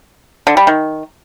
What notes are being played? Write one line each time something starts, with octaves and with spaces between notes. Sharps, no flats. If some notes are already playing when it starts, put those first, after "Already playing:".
D3
G3
D#3